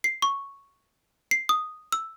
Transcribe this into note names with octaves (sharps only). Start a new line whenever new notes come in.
C7
C#6
C7
D#6
E6